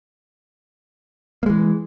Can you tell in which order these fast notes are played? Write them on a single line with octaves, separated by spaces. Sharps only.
A#3 G#3 E3